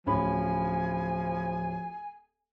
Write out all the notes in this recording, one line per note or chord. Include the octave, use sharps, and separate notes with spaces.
D1 F3 C#4 G#5 B5